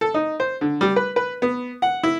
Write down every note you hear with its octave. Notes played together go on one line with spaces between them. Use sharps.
A4
D#4
C5
D3
G3
B4
B4
B3
F#5
E4